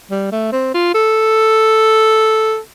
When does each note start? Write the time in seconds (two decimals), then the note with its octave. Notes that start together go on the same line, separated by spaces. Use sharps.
0.11 G3
0.32 A3
0.53 C4
0.74 F4
0.95 A4